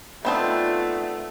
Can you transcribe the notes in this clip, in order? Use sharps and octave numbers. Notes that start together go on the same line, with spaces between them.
A3 B3 C4 D4 D#4 F4